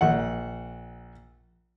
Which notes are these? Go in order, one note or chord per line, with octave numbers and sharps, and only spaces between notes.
A#1 F#5